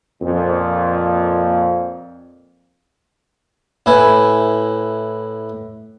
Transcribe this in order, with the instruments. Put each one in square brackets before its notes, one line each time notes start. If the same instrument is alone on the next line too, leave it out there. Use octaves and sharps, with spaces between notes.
[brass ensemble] F2 A#2
[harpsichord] A2 E4 B4 G#5